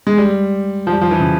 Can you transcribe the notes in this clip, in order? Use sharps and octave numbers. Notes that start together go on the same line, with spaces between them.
G#3
G3
F3
G3
F3
E3
C#3